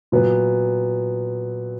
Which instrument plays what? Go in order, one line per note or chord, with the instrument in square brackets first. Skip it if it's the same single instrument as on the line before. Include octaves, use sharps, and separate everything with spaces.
[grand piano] A#2 F#3 B3